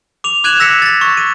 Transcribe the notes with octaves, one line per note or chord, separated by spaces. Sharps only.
D6 F7
D6 F#6 G#6 D#7 E7 F#7
E6 A#6 B6 C#7
A6 A#6
C#6
D#7